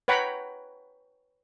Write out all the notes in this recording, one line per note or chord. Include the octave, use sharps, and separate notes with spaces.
B4 C#5 F#5 G5 A#5 B5